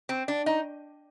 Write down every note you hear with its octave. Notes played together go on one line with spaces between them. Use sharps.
C4
D4
D#4